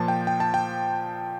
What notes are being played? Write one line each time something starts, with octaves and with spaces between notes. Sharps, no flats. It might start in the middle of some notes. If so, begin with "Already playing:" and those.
Already playing: A#2 F3 A5
G5
G5
A5
G5